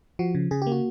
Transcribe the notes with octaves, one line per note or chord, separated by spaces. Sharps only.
F3 F#4
C#3
C#3 G#4
G4
A#3
F#4